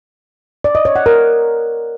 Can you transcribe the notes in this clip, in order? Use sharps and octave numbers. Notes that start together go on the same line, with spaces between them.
D5
D#5
C#5
F#5
A#4